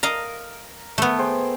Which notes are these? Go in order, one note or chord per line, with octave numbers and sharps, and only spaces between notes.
A#4 D#5 F5 A#5
A3 B3 A4 E5
G#4 C5 G5